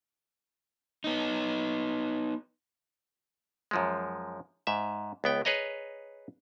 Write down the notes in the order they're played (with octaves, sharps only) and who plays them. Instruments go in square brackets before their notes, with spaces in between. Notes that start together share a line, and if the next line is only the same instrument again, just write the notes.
[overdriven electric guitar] B3 D#4
[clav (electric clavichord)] F#2 F3 G#3
G#2 E5
C#2 B3 G5
G#4 B4 C#5 D#5 A#5